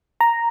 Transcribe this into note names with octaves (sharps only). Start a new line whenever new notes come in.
A#5